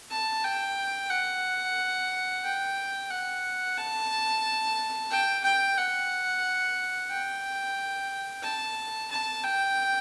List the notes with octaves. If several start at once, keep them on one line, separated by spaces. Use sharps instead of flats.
A5
G5
F#5
G5
F#5
A5
G5
G5
F#5
G5
A5
A5
G5